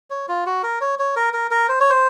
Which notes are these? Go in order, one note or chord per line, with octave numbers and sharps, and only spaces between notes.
C#5
F4
F#4
A#4
C#5
C#5
A#4
A#4
A#4
C5
C#5
C5